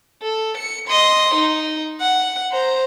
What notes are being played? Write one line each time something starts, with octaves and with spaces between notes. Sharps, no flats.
A4
C#7
D#5 C6
D#4
F#5
C5 A#5